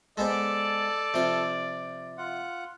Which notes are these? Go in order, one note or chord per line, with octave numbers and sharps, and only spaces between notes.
G#3 B3 A4 C5 D5 A5
C3 F3 C6
F4 F#5